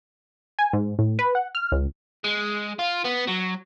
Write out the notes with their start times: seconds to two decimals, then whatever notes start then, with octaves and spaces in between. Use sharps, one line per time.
0.59 G#5
0.73 G#2
0.99 A2
1.19 B4
1.35 F#5
1.55 F6
1.72 C#2
2.24 G#3
2.79 F4
3.04 B3
3.27 F#3